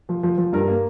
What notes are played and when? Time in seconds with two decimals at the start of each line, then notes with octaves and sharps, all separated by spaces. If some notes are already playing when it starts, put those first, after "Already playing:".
0.09 F3
0.23 F3
0.38 F3
0.53 G2 A#4
0.68 A#3